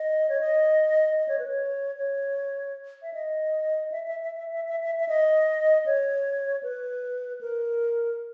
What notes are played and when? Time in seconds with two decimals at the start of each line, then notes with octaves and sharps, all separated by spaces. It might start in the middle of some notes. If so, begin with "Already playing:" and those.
Already playing: D#5
0.29 C#5
0.41 D#5
1.20 D#5
1.28 C#5
1.39 B4
1.48 C#5
1.97 C#5
3.02 E5
3.14 D#5
3.92 E5
4.07 E5
4.23 E5
4.37 E5
4.53 E5
4.68 E5
4.84 E5
5.00 E5
5.08 D#5
5.86 C#5
6.63 B4
7.41 A#4